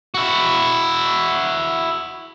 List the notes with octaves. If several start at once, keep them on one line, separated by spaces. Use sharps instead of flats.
E4 F#4